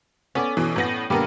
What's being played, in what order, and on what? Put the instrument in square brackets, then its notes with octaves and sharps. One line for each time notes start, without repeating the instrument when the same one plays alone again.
[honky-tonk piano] B3 [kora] C#4 A4 D5
[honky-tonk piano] B2 E3
A2 B3 A#6
[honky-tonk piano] A#2 D3 B3 [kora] G3 A#4